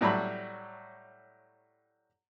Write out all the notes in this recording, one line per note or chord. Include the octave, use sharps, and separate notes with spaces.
A2 F#3 G3 A5 B5